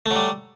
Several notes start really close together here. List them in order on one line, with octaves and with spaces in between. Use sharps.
A3 F#3 G3